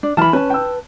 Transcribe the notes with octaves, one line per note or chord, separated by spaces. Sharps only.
D4
E3 A5 B5 F6
C#4 B4 A5
G5 E6